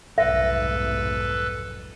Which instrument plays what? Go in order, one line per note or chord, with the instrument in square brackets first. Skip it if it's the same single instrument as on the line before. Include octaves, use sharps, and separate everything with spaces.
[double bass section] F1 B1 G#2 [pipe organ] A4 B4 [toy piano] E5